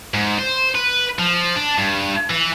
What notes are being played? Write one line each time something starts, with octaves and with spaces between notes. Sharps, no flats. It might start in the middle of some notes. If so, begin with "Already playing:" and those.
G#2
C5
B4
F3
D4
G2
E3